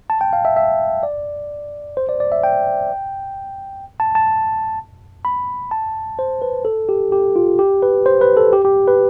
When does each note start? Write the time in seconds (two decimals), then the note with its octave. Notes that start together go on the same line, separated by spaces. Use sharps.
0.10 A5
0.21 G5
0.33 F5
0.45 E5
0.57 E5
1.03 D5
1.97 C5
2.09 D5
2.20 D5
2.32 E5
2.44 G5
4.00 A5
4.15 A5
5.25 B5
5.71 A5
6.19 C5
6.42 B4
6.65 A4
6.89 G4
7.12 G4
7.36 F4
7.59 G4
7.82 B4
8.06 C5
8.21 B4
8.37 A4
8.53 G4
8.65 G4
8.88 B4